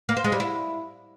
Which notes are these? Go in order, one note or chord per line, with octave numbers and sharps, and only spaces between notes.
A#3
C5
G#3
G3
E4